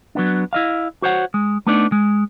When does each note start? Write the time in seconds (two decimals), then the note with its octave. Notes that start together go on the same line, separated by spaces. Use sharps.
0.15 F#3 B3 D4
0.53 E4 D#5 F5
1.02 F#4 C5 C#5 F#5
1.34 G#3
1.67 A3 B3 D4 D#4 D5
1.92 G#3